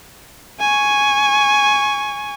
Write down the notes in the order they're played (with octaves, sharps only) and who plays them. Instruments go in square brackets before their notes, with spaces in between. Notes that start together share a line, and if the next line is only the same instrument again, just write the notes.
[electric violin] G#5 C#6